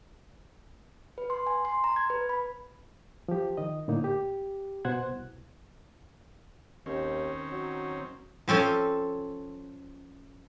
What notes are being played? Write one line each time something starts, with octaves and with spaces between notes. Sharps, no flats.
B4
C6
G#5
C6
A#5
G#6
B4
B5
F3 G4
D#3 D#5
A2 D3 A#3 D#4
G4
B2 C5 F#5 F#6 G#6
C2
D#2 D#3 C4 C#4
F#3
F3 C4 C#4 A4